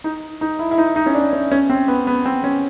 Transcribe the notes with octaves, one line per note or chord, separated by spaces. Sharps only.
D#4
D#4
E4
E4
D#4
D#4
C#4
D4
C#4
C#4
C4
B3
B3
C4
C#4